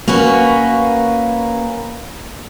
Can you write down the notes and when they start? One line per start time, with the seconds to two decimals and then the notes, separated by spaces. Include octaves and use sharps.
0.08 A#3 C#4 F#4 B4